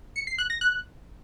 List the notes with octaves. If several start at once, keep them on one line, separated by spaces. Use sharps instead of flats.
C#7
C7
F#6
A#6
F#6